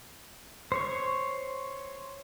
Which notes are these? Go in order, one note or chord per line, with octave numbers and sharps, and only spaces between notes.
C5 C#5 C#6